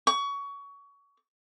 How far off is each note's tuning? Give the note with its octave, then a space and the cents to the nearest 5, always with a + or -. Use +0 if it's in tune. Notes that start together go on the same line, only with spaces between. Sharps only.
C#6 +25